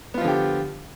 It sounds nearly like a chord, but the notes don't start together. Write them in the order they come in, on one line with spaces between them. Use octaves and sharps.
B3 F4 F3 D3 G4